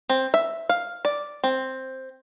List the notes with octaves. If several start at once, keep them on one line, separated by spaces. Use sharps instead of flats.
C4
E5
F5
D5
C4